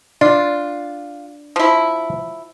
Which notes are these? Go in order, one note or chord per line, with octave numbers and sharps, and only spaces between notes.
D4 F4
F3 E4